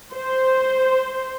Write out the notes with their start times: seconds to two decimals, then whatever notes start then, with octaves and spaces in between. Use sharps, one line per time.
0.12 C5